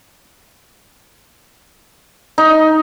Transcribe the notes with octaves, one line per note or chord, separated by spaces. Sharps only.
D#4